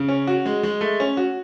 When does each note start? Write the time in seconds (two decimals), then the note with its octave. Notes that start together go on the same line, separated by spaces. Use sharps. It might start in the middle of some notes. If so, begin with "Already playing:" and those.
Already playing: C#3
0.08 C#4
0.27 F#4
0.46 G#3
0.63 G#3
0.81 A3
1.00 C#4
1.17 F#4